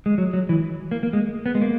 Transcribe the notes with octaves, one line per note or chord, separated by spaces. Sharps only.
G#3
F#3
F#3
E3
A#3
A#3
G#3
B3
G#3
A#3